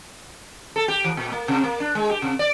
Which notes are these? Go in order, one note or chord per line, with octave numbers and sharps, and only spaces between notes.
A4
G4
E3
A#2
A#3
C3
A#3
D4
G#3
G4
C3
D5